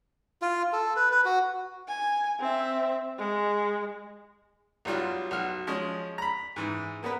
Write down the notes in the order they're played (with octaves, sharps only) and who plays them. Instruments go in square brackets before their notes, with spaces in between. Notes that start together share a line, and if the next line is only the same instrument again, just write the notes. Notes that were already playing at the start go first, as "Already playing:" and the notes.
[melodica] F4
A4
B4
B4
F#4
[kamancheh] G#5
C4 E5
G#3
[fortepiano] B1 F#3 G3 F4 F#4
B1 F#4 F6
F3 G#3 C#4
A#5 B5
G#2 E3
A#3 B3 A#4 B4